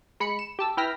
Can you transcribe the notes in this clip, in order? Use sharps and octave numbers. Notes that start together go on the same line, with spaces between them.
G#3 B5 C#7
E7
G4 A5 E6
E4 B4 G5 F6 A#6 B6